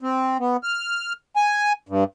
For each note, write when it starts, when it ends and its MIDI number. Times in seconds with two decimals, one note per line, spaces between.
0.01 0.37 60
0.40 0.57 59
0.63 1.13 89
1.36 1.73 80
1.89 2.04 43